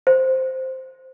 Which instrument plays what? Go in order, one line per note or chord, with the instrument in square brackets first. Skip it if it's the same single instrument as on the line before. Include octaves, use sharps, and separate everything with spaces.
[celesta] C5